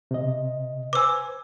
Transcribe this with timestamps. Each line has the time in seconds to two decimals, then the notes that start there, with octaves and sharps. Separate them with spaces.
0.11 C3 D#5
0.93 B4 C5 G#5 D6 E6